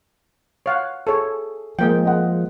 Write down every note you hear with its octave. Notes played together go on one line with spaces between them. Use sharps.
C#5 F5 F#5
G#4 A4 C#5
F3 G#3 A#3 G5
G#3 D#5 F#5